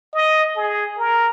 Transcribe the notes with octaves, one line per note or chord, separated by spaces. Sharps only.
D#5
G#4
A#4